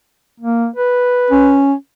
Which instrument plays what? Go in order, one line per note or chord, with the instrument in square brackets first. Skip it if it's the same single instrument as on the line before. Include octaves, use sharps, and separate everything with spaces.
[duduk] A#3
B4
[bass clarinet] C#4